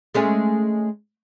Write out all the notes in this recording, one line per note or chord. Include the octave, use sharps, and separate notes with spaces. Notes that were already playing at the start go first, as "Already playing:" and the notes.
G#3 A3 C#4